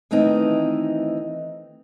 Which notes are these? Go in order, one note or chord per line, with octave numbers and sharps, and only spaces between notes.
D#3 E3 A3 C4 D#4